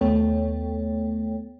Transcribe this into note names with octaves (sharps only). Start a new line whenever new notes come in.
D#2 A3 B3 A4 C#5 G5